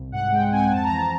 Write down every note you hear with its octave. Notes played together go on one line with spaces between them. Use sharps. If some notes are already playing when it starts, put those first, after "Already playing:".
Already playing: C2
G#2 F#5
G#3 G5
C4 G#5
F2 A5
A#5
E3
A5